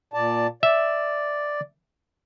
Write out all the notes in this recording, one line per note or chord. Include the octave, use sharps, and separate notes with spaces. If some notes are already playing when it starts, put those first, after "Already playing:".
A#2 D5 A5
D5 E5